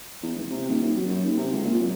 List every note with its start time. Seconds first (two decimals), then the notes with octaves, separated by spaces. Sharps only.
0.23 E2
0.35 F1
0.50 C3
0.69 D#1
0.82 D#2
0.96 F#3
1.08 F#2
1.25 D#2
1.37 C3
1.52 C#2
1.64 A#2
1.80 F#2